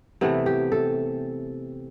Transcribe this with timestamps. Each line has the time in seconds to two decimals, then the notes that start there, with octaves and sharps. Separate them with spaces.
0.21 C3 E3 A3 B3
0.46 G4
0.72 A4